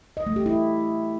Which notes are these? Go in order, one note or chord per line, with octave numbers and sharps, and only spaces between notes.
D#5
A3
G4
E4